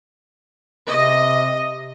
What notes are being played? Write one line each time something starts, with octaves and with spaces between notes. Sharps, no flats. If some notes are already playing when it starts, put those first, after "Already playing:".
C3 D#5